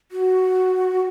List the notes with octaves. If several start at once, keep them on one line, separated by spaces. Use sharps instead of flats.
F#4